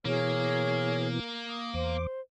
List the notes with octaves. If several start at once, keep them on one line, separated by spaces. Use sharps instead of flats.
B2 E3 A#3 G#4 C#5 F6
D#6
E2 C5 D6